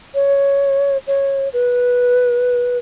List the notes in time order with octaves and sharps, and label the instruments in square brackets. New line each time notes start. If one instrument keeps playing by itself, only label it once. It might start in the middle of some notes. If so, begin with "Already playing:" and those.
[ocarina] C#5
C#5
B4